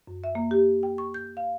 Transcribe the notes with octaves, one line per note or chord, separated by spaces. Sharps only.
F#2
E5
A#3
G4
G5
C#6
G6
F5